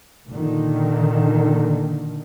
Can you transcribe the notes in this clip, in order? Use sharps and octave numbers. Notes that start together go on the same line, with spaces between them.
A#2 D3 D#3